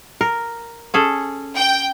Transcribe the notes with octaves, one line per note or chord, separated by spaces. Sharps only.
A#4
C#4 G#4 A4
G5